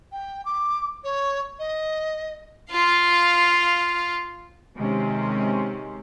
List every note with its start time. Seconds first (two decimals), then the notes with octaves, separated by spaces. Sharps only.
0.12 G5
0.45 D6
1.04 C#5
1.59 D#5
2.71 F4 F5
4.76 C3 D#3 G#3 C4 C#4